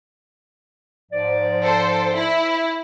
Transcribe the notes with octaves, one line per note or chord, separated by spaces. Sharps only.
G#2 F3 D5
A4 C5
E4